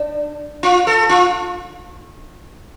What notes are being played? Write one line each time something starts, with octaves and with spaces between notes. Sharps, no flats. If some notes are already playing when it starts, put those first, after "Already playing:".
Already playing: D4
F4
A4
F4